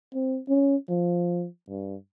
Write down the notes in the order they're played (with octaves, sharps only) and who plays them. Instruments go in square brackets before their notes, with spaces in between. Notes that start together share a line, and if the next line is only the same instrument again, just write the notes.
[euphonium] C4
C#4
F3
G2